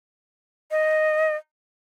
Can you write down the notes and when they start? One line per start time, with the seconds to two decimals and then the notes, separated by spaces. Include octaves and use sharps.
0.71 D#5